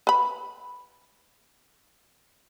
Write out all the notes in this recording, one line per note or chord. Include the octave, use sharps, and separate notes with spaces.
B4 B5